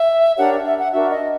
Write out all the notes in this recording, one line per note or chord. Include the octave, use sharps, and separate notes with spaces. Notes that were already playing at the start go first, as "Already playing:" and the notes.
Already playing: E5
D4 G4 A#4 C#5 F#5
E5
F#5
D4 F#4 A#4 E5
D#5